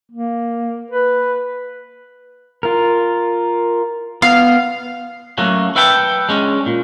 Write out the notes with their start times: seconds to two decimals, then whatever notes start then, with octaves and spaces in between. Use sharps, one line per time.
0.12 A#3
0.91 B4
2.63 F4 A#4
4.22 B3 F5
5.38 F#3 A3 A#3 C#4 F#4
5.75 B4 E5 F#5 G5 A5
6.29 G#3 C#4 D4
6.66 A#2